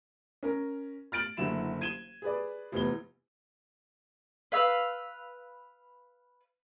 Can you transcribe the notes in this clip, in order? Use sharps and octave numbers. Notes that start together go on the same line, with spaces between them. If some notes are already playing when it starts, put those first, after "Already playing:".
C#4 A#4
F6 A6 D7 F#7
F#1 D3 F#3 E4 E7
G#6 D#7 E7 G7
G#4 B4 D5
F1 E2 B3 G7
B4 F5 E6